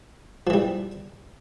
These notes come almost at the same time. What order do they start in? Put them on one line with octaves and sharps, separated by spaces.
F3 E3 G3